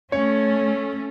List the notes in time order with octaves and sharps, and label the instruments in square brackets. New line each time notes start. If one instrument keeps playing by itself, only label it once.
[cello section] A3 C#4 [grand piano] C#5